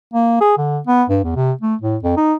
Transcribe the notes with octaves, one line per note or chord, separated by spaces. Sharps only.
A#3
G#4
D3
B3
G2
E2
C3
A3
A2
F2
D#4